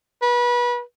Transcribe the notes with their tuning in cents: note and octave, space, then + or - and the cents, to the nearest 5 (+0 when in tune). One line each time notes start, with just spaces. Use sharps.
B4 -30